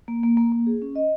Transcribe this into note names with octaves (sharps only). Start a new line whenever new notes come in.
A#3
A#3
A#3
A#3
G#4
C#4
D#5